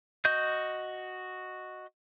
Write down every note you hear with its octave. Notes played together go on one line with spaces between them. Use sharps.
F#4 D#5 G6